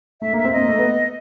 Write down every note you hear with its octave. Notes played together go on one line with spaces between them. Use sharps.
A3 E5
A#3
E5
C4
A#3 D#5
A3
B3